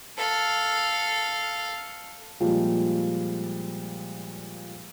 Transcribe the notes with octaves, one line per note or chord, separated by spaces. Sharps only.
A4 F5
A#2 F3 G3 G#3